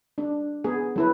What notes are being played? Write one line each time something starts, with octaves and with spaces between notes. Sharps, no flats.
D4
B3 G#4
F#3 E4 B4